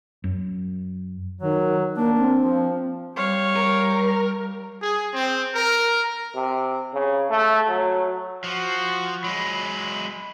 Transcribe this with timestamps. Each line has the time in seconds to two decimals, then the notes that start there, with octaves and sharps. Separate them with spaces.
0.24 F#2
1.41 D#3 F#3
1.97 A#3 D4
2.18 C4
2.40 F3
3.16 G3 C#5 F5
3.56 A#4
4.82 G#4
5.14 C4
5.54 A#4
6.35 C3
6.94 C#3
7.30 A3
7.68 F#3
8.44 F3 F#4
9.24 F#3 G#3 B5